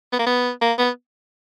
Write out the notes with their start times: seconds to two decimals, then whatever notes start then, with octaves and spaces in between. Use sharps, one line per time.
0.13 B3
0.19 A#3
0.26 B3
0.62 A#3
0.79 B3